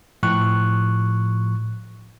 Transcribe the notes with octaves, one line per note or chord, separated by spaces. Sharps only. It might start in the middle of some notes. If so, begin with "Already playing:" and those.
A2 F3 C#6 F#6